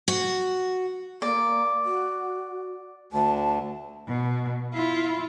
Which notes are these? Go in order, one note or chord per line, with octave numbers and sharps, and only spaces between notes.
F#4
A#3 D5
F#4
D2 A5
B2
E4 F4